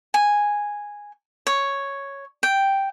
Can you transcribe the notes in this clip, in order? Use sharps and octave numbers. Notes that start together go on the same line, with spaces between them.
G#5
C#5
G5